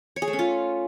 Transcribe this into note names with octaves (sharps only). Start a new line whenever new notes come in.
C#5
G#4
A3
C#4
F4